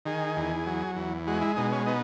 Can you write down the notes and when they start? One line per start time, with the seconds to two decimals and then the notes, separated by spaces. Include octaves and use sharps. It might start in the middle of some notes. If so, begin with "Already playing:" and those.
0.05 D#3 G#4
0.37 E2
0.66 F#3
0.96 E2
1.27 G#3 F#4
1.41 E4
1.56 B2 D#4
1.72 C#4
1.87 B3 D#4